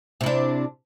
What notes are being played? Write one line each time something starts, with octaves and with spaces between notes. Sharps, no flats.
C3 D4 E4